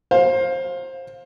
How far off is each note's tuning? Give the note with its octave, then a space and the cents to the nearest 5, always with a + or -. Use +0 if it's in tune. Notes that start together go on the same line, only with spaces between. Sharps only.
C5 +20 F5 +15